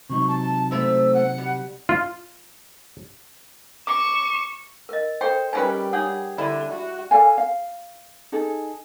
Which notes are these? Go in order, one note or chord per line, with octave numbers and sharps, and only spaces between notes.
C3 F#3 D#4 C#6
A5
A3 C4 E4 E6
F#5
G3
F4
C#6 D6 E7
A#4 D#5
A4 C5 G5
D#3 G3 C#4 A#4 B4 G5 G#5
D4 G#4 C#5 F#5
D3 E4
F#4
A4 D5 F5 G#5
F5
D#4 G#4 A4